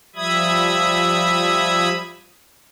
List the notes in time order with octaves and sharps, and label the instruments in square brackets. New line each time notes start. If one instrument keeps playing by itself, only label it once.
[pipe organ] F3 G3 E5 B5 D#6 G#6